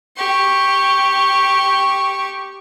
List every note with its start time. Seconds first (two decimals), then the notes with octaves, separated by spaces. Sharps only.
0.17 G4 C#6